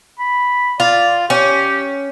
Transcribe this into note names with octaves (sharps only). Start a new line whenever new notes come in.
B5
F4 D5
C#4 G4